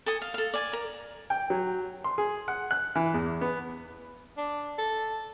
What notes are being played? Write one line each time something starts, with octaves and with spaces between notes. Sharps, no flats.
A4 G#5 D#6
F5
A4 F5
D5 G#5
A#4
G5
F#3
C6
G#4
F#5
F#6
E3
E2
B3
D4
A4